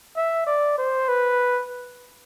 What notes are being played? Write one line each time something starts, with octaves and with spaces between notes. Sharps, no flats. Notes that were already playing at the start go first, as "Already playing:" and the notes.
E5
D5
C5
B4